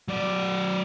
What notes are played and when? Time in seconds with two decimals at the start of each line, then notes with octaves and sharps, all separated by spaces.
0.08 F#3 D5